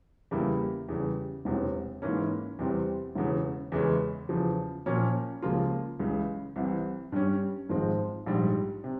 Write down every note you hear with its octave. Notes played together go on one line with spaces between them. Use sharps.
E2 C#3 G3 A#3 E4
E2 C#3 G3
E1 E2 C3
G#2 E3 A#3 C#4
E2 C3 G3 C4
E1 E2 C#3
E2 C#3 E3 G#3 C#4
E2 C#3 F3
A#2 F3 A#3 C#4
C#2 C#3 F3 A#3 F4
C#2 C#3 E3
C2 C3 E3
G2 G3 C#4
G#1 G#2 F3 G#3 C4
A#1 G#2 G3
C3